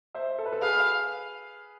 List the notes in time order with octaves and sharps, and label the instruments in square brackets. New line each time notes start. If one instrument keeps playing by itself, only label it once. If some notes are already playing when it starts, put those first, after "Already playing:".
[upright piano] C5 E5
A4
B4
A4
[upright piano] G#4 B4 [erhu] F5